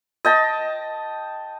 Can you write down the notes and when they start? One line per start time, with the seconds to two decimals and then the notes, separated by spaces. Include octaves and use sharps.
0.25 D#5 G5 A5